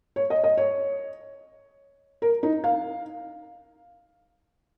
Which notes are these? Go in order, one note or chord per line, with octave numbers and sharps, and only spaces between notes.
C#5
D#5
D#5
C#5
A#4
D#4
F5